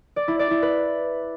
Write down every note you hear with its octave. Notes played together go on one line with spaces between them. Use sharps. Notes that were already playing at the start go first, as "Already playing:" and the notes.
D5
E4
D5
E4
B4